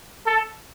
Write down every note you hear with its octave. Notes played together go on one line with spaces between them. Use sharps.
A4